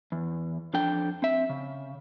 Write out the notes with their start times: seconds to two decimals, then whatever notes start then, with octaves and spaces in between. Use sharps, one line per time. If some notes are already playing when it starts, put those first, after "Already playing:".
0.12 E2
0.74 F2 D4 A4 G5
1.22 C4 E5
1.49 C#3